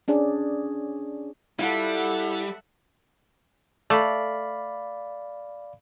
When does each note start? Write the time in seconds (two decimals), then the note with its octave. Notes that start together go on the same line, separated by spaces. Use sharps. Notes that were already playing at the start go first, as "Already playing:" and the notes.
0.08 C#4 D4 G#4 D5
1.59 G3 E4 F4 A4 E5 F#5
3.90 A3 D5 F5 B5